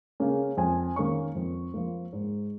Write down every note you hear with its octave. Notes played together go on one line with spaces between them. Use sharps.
C#3 A#3 C#4
F2 G#5
D#3 A#3 C#4 C#6
F2
F3 A#3
G#2